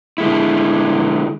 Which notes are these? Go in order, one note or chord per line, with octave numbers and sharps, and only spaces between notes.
D3 G#3 E4